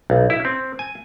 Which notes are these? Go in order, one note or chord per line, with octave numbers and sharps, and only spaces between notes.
B1
E4
C4
G#5